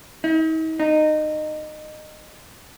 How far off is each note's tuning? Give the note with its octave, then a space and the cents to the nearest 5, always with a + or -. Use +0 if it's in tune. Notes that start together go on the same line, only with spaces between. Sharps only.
D#4 +45
D#4 -20